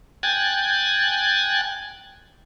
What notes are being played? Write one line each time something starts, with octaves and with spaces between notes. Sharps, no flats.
G5 G#5 F#6 G#6 A6